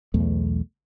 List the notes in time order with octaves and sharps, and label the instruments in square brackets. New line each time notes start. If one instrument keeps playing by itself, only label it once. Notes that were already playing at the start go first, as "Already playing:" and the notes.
[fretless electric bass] B1 E2 A3